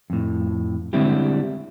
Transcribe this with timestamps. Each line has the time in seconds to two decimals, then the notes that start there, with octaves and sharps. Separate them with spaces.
0.10 F2 A2
0.93 D3 G3 G#3 C4 E4 G4